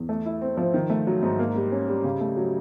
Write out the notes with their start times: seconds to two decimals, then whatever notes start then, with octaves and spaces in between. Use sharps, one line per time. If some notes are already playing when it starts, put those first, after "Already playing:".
Already playing: E2
0.09 A3
0.25 E4
0.41 C4
0.57 F3
0.74 D#3
0.90 A3
1.07 F#3
1.23 G#2
1.39 A#3
1.56 G3
1.72 C#4
1.88 G3
2.04 C#3
2.21 A3
2.37 F#3